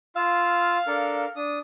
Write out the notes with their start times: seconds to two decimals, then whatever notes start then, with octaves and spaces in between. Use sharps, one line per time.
0.16 F4 F5 E6
0.87 D4 A4 A#4
1.36 D4 D#6